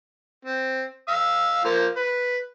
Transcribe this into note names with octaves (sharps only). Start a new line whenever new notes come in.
C4
F5 E6
F3 A#3 C5
B4